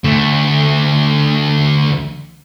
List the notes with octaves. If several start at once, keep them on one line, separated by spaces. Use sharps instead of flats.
D2 A3